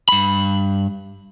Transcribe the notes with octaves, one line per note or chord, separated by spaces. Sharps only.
G2 B5